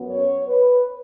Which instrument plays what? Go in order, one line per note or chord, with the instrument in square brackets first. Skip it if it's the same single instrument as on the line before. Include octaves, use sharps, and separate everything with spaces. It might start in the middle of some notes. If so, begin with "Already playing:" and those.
Already playing: [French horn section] F#2 B3
C#5
B4